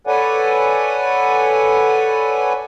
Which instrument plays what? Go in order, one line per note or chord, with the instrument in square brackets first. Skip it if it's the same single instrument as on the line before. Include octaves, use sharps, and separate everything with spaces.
[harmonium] A4 B4 C#5 D5 F#5 G#5